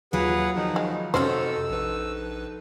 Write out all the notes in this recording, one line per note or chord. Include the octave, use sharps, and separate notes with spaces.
D#2 F#3 F4 G#4 B4 F#5
D#3 F3 D#4
G#3
F2 C3 C#4 D#4 F#4 A4 C5 E6
A#1 B4